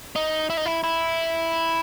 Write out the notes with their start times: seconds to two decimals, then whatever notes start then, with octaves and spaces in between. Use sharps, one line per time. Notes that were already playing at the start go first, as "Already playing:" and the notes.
0.16 D#4
0.50 E4
0.57 D#4
0.66 E4
0.84 E4